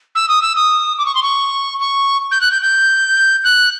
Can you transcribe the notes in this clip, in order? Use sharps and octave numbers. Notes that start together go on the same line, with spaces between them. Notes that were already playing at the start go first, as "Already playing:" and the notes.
E6
D#6
E6
D#6
D6
C#6
C6
C#6
C#6
G6
F#6
G6
G6
F#6